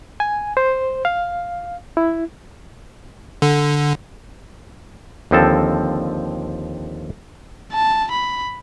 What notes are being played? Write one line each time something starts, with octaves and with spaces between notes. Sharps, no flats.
G#5
C5
F5
E4
D3
D#2 D3 F3 C4 A4 A5
A5
B5